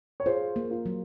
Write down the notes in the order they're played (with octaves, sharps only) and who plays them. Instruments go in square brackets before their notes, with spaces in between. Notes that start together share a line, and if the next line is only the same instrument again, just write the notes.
[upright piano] C#5
[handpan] F4 [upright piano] G#4 C5
[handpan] A#3
[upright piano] F4
[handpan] F#3